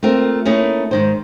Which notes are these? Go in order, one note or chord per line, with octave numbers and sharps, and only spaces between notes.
A3 A#3 C4 F4 A#4
A3 A#3 C#4 D#4 E4 G#4
G#2 D#3 C5